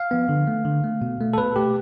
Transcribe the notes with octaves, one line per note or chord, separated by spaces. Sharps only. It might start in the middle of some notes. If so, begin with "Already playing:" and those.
Already playing: F5
F3 B3
D3
A3
D3
A3
B2
A3
A4
B2 B4
A3 G4